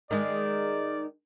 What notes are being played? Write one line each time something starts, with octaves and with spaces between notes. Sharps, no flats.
D#3 G#3 D5